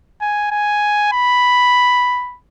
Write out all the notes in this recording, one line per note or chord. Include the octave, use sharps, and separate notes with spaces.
G#5
G#5
B5